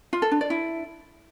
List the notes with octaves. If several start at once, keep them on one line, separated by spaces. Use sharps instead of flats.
F4
A4
D4
D5
E4